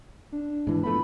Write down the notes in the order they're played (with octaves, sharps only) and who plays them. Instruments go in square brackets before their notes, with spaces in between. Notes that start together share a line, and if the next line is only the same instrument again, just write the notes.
[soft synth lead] D4
[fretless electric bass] G#2 E3
[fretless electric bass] F3 A3 B3 [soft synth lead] B5